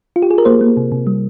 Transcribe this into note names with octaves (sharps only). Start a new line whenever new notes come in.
F4
G4
G#4
A#4
A#3 C5
A#3
C3
C3
G3